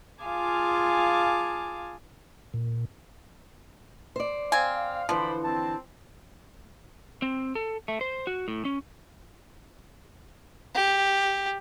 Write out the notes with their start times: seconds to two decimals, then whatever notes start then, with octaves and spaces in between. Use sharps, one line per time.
0.23 F4 G#4 F5 G#5 A5 D6
2.54 A#2
4.16 C5 D5
4.52 C4 F5 G#5
5.09 D3 E3 F3 C5 D5 B5
5.43 C4 A5
7.22 C4
7.55 A4
7.88 A3
8.01 C5
8.27 F#4
8.48 A2
8.65 C#4
10.75 G4